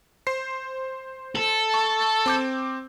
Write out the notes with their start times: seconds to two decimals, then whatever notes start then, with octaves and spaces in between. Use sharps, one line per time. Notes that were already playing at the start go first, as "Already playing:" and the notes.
0.27 C5 C7
1.35 A4
1.74 C#6
2.26 C4 D6 G6